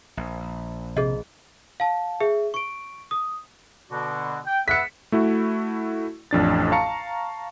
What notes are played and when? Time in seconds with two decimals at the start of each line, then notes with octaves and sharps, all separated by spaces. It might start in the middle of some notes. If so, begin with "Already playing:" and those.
0.17 A#1
0.97 C3 G#4 D#5
1.80 F5 A5
2.21 G#4 E5
2.54 C#6 D7
3.11 D#6
3.91 B2 D3 F#4
4.46 G5
4.68 B3 E5 F#5 B6 C#7
5.12 A3 E4 F#4
6.31 A1 F2 D4 A6
6.72 F5 A5 A#5 C#6 C#7